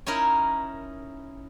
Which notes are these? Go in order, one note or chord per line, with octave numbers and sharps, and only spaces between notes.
C#4 D#4 E4 A#4